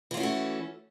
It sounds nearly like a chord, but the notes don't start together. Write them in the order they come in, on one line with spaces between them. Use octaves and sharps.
E3 F4 C#4 F#4 A3